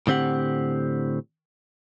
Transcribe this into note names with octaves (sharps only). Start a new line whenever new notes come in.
A2 D3 C4 G4 F#5